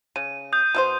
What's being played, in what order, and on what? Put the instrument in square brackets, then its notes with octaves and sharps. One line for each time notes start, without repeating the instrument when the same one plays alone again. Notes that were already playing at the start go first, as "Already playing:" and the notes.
[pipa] C#3 [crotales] D#7
[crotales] D#6 G6
[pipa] B2 E4 C5